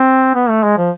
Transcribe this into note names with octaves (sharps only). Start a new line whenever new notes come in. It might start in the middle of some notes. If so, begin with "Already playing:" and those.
Already playing: C4
B3
A3
G#3
F3